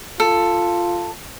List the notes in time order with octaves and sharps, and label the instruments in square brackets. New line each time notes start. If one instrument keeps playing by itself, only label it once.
[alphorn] F4 [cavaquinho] A4